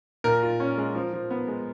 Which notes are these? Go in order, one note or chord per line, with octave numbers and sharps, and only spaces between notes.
A#2 A#4
F4
C#4
G#3
F3
F3
B3
G#3